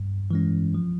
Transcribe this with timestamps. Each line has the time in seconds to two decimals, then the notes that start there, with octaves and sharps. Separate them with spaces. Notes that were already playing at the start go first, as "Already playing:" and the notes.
Already playing: G2
0.31 E3 G#3 C#4
0.75 F3